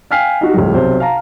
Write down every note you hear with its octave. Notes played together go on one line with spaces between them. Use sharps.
F5 G5 G#5 F6 B6 C7
D#4 F#4 G4
C#2 A2 F3 G3
B1 C3 C5
F5 A5 A#5